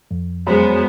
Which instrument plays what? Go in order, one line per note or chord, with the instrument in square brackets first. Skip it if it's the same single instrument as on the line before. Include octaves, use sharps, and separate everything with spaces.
[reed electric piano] F2
[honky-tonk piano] F#2 [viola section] G#3 B3 [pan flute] C5